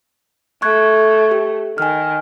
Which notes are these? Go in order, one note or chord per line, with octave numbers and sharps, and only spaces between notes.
A3 C#6 F#6 G#6
G4
D#3 G#5 F6